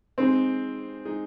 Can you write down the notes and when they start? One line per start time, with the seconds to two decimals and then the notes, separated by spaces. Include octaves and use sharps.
0.18 G#3 C4 D#4 G#4
1.05 G#3 D#4 G#4